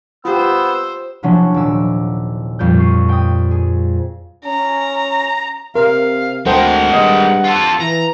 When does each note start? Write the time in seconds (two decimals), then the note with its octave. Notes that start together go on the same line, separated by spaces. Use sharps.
0.25 B3 F4 G4 C5 E6
1.23 C3 F3 F#3 C#4 D4 E4
1.54 D#1 D6 E6
2.59 F2 A#2 G3 D5 G6
2.78 C#6 C7 D#7
3.09 G5 D#6
3.51 G#4
4.45 C#4 A#5
5.75 C3 A#4 F5
6.46 D2 G#3 A4 A#4 C5 F#5 G5
6.93 G2 D#5
7.44 F4 A4
7.80 E3 A#5